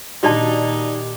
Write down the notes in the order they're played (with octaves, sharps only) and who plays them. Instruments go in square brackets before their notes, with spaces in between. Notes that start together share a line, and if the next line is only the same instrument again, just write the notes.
[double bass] A#2 D#3 [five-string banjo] G3 D4 [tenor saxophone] D#4 [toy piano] F#4 D5 A5